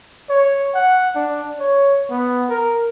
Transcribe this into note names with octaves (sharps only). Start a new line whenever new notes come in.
C#5
F#5
D4
C#5
B3
A#4